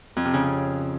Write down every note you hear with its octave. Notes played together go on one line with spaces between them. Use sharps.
F2
C3
C#3